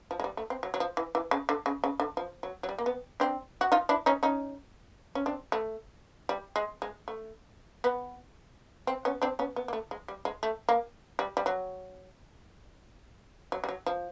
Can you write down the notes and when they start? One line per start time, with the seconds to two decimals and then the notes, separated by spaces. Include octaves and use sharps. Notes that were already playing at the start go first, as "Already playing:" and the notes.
0.11 F3
0.20 G#3
0.24 G3
0.37 A3
0.50 C4
0.63 F#3
0.74 F#3
0.80 F3
0.97 E3
1.15 E3
1.31 C#3
1.49 D3
1.66 C#3
1.84 C#3
2.00 D3
2.17 F3
2.43 F#3
2.63 F#3
2.69 G3
2.78 A#3
2.86 B3
3.20 C4 D4
3.61 F#4
3.72 D#4 F4
3.89 D4 E4
4.06 C#4 D#4
4.23 C#4 D#4
5.15 C#4
5.26 C4 D4
5.52 A3
6.29 G3
6.56 G#3
6.82 G#3
7.08 A3
7.84 B3
8.87 C4
9.05 B3 C#4
9.22 C4 D4
9.39 B3 C#4
9.56 B3
9.68 A#3
9.73 A3
9.91 G#3
10.08 G3
10.25 G#3
10.43 A3
10.69 A#3
11.19 G3
11.37 G3
11.46 F#3
13.52 F#3
13.64 G3
13.69 F#3
13.86 F3